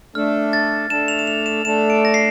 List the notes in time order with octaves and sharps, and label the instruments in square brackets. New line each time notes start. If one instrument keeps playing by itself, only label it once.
[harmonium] A3 D4 A4 [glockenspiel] F6
[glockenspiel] A6
[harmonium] A3 D4 A4 [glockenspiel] E7
[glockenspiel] F7
E7
F7
E7
[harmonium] A3 D4 A4 [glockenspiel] E7
[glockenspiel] D7
A#6
C7